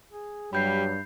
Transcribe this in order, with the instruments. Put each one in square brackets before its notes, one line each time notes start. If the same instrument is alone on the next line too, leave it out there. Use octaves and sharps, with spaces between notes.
[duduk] G#4
[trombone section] G2 [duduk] F#3 [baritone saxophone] G3 [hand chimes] B5 G6 C7